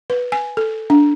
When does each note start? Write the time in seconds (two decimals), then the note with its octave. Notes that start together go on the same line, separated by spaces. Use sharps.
0.10 B4
0.32 G#5
0.57 A4
0.90 D4